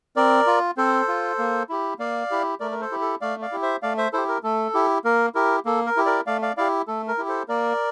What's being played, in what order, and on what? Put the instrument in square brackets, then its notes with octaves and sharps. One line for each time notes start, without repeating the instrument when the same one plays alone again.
[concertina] C4 A#4 D5
F4
C4 A4 C5
F4
A#3
E4 G4
A#3 D5 F5
E4 G4
A3 A#4 D5
A#4
A4 C5
E4 G4
A4
A3 D5 F5
D5 F5
E4 G4
C5 E5
A3 D5 F5
C5 E5
E4 G4 A4 C5
A#4
A3 A4
E4 G4
A#3 A#4
E4 G4 A#4
A#3 A4
A#4
E4 G4
A#4 D5
A3 D5 F5
D5 F5
E4 G4 D5 F5
A3 A4
A#4
E4 G4
A4 C5
A#3 A#4 D5